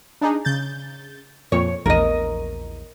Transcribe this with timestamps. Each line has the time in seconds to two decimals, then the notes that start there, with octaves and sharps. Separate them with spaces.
0.21 D4 D#4 G#4
0.45 C#3 G6 A6
1.52 F2 A#2 C#5
1.86 A#1 E2 A#4 D#5